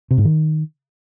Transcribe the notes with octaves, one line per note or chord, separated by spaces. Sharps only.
C3
G#2
D#3